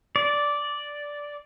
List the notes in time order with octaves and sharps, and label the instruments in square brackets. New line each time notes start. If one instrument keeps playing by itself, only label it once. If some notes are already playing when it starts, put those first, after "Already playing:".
[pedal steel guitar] D5